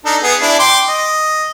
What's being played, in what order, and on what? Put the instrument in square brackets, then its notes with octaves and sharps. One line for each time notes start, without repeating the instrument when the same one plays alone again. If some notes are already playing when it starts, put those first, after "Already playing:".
[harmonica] D4 D#4 A4
B3 G#4
D4 E4
G5 C6 D6
D#5